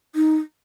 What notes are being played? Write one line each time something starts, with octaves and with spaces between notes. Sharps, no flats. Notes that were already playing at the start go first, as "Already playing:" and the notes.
D#4